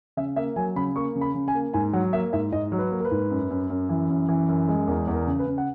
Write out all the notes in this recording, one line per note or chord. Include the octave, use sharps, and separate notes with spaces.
C#3 E5
A#3 E5
F#3 G#5
C#3 B5
A#3 C#6
C#3
B5
C#3
G#5
A#3
G#2 G#5
F#3 F#5
A#3 E5
G#2 E5
G#2 D#5
F#3
B4
A#3
A#4
B4
G#2
F#2
F#2
F#2
E3
F#2
E3
F#2
G#3
E2 A#4
E2
A#4
C#3
B4
C#3
F#5